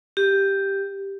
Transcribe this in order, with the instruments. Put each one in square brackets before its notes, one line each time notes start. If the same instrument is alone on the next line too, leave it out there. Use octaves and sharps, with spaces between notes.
[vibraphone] G4